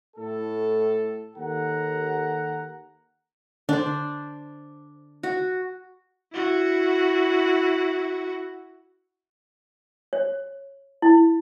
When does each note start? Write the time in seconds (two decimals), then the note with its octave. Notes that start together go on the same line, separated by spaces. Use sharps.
0.17 A2 A4
1.37 D#2 A4 F#5 A#5
3.69 D3 D4 C5
5.23 F#4
6.33 E4 F#4
10.13 C#5
11.02 E4